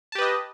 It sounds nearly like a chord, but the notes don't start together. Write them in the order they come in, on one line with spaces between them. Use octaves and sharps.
A5 G4 B4 D#5